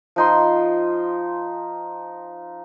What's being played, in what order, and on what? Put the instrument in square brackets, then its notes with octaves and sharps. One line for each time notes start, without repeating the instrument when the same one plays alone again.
[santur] F3 D#4 C6